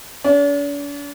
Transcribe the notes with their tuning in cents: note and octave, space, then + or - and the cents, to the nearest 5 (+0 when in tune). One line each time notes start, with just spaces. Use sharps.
D4 -45